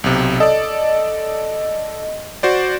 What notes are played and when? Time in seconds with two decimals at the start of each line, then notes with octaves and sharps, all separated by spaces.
0.04 B1 C3
0.40 A4 D5 D#5
2.43 F#4 C5 D5